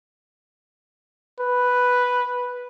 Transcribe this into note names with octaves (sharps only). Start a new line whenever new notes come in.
B4